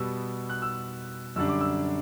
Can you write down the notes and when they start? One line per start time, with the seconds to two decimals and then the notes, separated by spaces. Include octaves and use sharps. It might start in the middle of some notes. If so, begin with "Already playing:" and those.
Already playing: B2 G3 B3 E6
0.50 F#6
0.62 E6
1.36 F#2 D3 G3 D4 E6
1.48 D6
1.61 E6